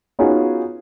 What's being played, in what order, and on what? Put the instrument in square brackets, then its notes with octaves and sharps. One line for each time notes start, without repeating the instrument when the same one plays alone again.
[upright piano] B3 C#4 D#4 F4 F#4 G#4